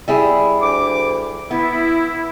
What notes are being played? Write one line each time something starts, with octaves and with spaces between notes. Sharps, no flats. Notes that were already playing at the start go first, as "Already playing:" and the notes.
G3 E4 G#4
D2 D6
B3 E4